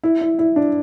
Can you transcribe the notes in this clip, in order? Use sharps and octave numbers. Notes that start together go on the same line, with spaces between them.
E4
E4
E4
D4